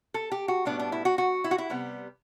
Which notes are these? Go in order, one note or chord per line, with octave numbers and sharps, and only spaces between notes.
A4
G4
F#4
A2 G3 B3 D4
D4
E4
F#4
F#4
E4
F#4
E4
C3 G3 B3